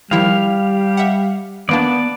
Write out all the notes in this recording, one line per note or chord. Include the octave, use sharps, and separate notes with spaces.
D#3 F3 G3 E4 F5
E5 F#5
D#3 A#3 B3 D4 D5 A5